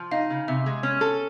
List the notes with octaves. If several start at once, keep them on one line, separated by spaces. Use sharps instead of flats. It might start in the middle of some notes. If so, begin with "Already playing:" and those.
Already playing: F3
D#4 F5
C#3
C3 E5
G#3
C#4
A4